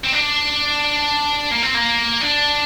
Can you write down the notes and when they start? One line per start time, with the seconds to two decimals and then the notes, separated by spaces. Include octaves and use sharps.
0.04 C4
0.13 D4
1.51 A#3
1.63 C4
1.75 A#3
2.21 D4